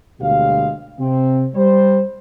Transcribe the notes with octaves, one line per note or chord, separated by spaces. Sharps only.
D2 B2 G3 G#3 G4 F5
C3 C4
G3 C5